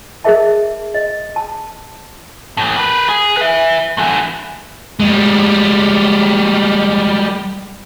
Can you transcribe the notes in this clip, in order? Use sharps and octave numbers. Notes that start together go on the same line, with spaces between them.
G#4 A#4 D#5 E5 A5
D#5
A5
A2 E3
A#4 B4
G#4
B4 E5
D3 E3
G3 G#3